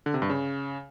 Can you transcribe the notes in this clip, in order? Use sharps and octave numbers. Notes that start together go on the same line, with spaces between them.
D3
C3
G2
C#3